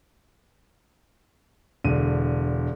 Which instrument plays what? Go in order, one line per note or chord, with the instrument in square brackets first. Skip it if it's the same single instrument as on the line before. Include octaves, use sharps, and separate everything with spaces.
[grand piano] E1 D3 D#7